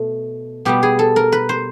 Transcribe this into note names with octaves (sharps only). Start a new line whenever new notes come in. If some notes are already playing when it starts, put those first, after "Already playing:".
Already playing: B2 A3
B2 G3 B3 G4
G#4
A4
A#4
B4
C5